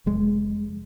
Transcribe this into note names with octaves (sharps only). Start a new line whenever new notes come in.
F1 G#3